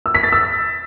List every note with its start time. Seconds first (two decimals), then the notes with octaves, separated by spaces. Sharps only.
0.06 E6
0.15 B6
0.23 A6
0.32 E6